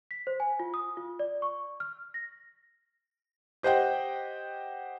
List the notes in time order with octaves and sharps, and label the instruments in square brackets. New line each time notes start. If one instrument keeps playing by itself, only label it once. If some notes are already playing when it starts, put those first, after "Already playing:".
[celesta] B6
C5
G#5
F4
D#6
F4
D5
C#6
F6
A#6
[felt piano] G4 C5 D#5 F#5 G5